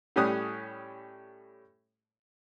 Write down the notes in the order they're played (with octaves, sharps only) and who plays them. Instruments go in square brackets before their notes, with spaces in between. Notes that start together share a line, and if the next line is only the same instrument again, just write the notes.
[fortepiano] A2 G3 C#4 G4 D#6 F#6